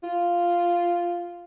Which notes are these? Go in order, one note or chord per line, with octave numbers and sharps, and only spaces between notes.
F4